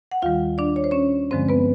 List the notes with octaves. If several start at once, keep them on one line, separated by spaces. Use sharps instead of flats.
F#5
D#2 D#3 G3 F4 F5
D4 D5
C#5
C5
C#4 C#5
G2 D3 F3 G#3 C4 C5
B3 B4